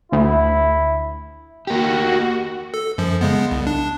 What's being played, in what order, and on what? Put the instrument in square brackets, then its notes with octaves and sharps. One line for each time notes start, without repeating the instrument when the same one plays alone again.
[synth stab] D2 [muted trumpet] E4
[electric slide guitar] A#3 G4 [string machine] F#4
[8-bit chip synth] A4
F#2 F3
C#3 G#3 B3
C2
D4